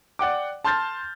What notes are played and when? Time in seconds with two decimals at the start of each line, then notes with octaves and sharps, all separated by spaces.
0.19 D5 F#5 G5 D6
0.65 A5 C6 F6 G6 A6